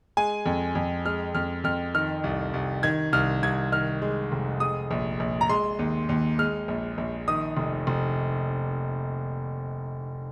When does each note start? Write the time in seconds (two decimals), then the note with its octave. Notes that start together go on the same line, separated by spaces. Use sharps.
0.17 G#3 G#5
0.46 F2
0.75 F2
1.06 G#3 F6
1.35 F2 F6
1.64 F2 F6
1.95 D#3 F6
2.24 C2
2.54 C2
2.83 D#3 G#6
3.13 C2 F6
3.43 C2 G#6
3.72 D#3 F6
4.02 G#3
4.32 F1
4.60 G#3 D#6
4.91 A#1
5.20 A#1
5.41 A#5
5.49 G#3 C6
5.79 D#2
6.09 D#2
6.39 G#3 F6
6.68 A#1
6.98 A#1
7.28 D#3 D#6
7.57 F1
7.87 F1